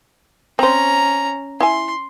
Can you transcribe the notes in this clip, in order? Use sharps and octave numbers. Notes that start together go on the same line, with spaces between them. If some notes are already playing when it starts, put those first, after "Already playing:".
C4 C#4 C5 A#5
E4 E5 G#5 C6